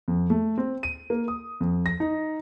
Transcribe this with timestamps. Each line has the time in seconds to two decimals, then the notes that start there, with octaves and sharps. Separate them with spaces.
0.08 F2
0.30 A3
0.58 C4
0.83 D#7
1.10 A#3
1.28 D#6
1.61 F2
1.86 A#6
2.00 D#4